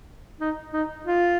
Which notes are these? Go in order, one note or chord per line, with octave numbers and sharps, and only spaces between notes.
D#4
D#4
F4